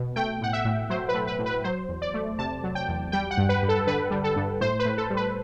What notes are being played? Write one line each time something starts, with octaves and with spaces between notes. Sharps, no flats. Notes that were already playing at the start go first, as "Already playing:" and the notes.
Already playing: B2
A3 G5
A2 F#5
E5
A2
F#3 C5
B4
A3
B4
A2
B4
F#3 C5
E2
D5
A3
C3 A5
F#3
G5
E2
G3 G5
F#5
G2
B4
G2
A4
D3 B4
G3
A4
G2
A2 C5
B4
A2
A4
G3
B4